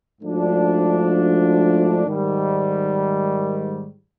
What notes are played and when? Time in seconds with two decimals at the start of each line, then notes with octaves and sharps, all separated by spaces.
0.21 G#2 F3 A3 D4 F#4
2.05 G#2 D#3 G3